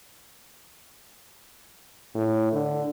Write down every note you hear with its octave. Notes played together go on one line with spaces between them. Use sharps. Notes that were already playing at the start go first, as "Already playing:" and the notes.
A2
D3